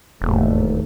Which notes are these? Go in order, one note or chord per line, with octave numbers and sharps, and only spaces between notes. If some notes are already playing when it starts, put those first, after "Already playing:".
E1 D#2 G#2 A3